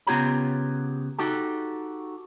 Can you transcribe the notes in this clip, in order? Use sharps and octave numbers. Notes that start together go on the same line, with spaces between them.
C#3 B3 F4 G4 C#5 A#5
D#4 F#4 G4 A4